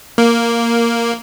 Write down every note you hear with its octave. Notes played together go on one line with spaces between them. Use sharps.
A#3